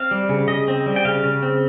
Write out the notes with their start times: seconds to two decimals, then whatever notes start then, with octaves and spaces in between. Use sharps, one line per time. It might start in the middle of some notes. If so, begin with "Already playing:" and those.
Already playing: C4 F5
0.11 G3
0.29 C#3
0.48 C#3 D#5
0.68 C4
0.86 G3
0.96 G5
1.05 C#3 F5
1.24 C#3
1.42 C4